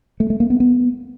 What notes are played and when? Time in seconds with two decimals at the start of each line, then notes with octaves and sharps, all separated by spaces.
0.20 A3
0.30 A3
0.40 A#3
0.50 B3
0.60 B3